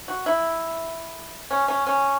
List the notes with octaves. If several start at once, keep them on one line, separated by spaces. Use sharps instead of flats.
F#4
E4
C#4
C#4
C#4